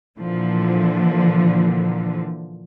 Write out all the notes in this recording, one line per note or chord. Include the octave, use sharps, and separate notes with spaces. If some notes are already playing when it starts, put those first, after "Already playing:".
A#2 D3 E3 F3